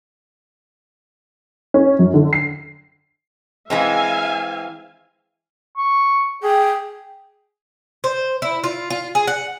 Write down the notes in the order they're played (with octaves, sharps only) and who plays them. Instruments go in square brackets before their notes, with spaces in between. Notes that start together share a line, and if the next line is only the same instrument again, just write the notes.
[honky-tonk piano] C#4
F#2
D3
C7
[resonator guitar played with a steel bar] E3 G#3 C4 [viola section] E5 F5 G#5
[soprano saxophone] C#6
[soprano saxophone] G#4 [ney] G5
[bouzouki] C5
E4
F4
F4
G#4
F#5